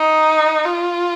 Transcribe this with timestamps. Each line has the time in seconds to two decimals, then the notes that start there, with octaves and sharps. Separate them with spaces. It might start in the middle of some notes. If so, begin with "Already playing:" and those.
Already playing: D#4
0.65 F4